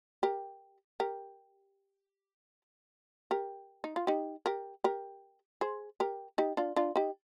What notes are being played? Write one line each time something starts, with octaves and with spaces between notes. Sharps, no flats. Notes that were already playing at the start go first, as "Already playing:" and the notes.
G4 A#4
G4 A#4
G4 A#4
D#4
F4
D#4 G4
G4 A#4
G4 A#4
G#4 C5
G4 A#4
D#4 G4
D4 F4
D4 F4
D#4 G4